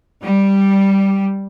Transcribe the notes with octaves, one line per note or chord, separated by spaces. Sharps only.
G3